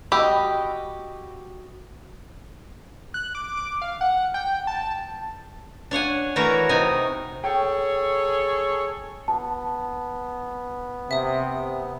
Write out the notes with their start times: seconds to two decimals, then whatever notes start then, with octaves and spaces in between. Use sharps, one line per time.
0.12 F#4 G4 D#5 B5 E6
3.14 F#6
3.35 D6
3.57 D6
3.82 F5
4.01 F#5
4.34 G5
4.67 A5
5.91 D4 C#5 F#5 G#5
6.36 E3 A3 F#4 A#4 C#5
6.69 C3 D#4 G#5
7.44 G#4 A4 C#5 G5
9.28 B3 A5
11.11 C3 E5 D#6